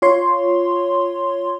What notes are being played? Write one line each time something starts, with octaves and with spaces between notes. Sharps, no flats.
F4 C#5 C6